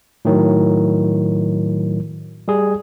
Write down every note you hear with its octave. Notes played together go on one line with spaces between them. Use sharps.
A2 D#3 F#3
G3 G#4